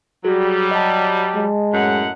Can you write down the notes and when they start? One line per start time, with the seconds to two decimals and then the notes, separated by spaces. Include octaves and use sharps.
0.24 F#3 G3 F#4 G#4
0.71 D#5 A5
1.35 G#3
1.74 F#2 A2 F#5